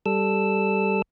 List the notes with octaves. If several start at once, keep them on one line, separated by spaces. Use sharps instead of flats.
G3 A4 E6